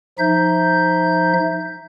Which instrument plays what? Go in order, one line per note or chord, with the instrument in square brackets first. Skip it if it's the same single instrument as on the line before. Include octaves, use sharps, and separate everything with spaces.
[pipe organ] F3 D#4 E5 G6